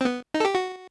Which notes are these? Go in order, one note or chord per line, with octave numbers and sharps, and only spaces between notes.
C4
B3
D#4
A4
G4
F#4